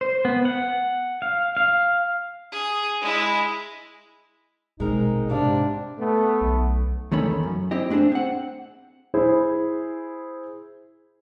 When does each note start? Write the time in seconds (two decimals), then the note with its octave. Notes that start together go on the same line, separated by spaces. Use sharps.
0.01 C5
0.25 B3
0.45 F#5
1.22 F5
1.57 F5
2.52 G#4
3.01 G#3 E4
4.80 A#1 B2 G#3 C4 D#4 A#4
5.30 G#2 C3 D4 F5
5.99 A3 B3
6.41 B1
7.12 E2 D#3 A3 C#4 B5
7.43 F#2
7.71 C4 E4 G4 D#5
7.90 A3 D4 G#4 A4 C5
8.12 C4 F#5
9.14 E4 G#4 C5